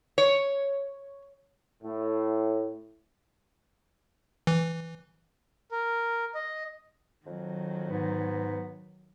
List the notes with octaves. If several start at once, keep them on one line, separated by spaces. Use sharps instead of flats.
C#5
A2
E3
A#4
D#5
F2 D#3 F#3
G#2 B3